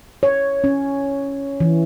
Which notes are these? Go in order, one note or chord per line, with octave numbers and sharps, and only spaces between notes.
C#5
C#4
E3